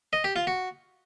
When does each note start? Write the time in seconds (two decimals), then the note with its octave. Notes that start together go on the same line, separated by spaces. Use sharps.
0.13 D#5
0.24 G4
0.36 F4
0.47 F#4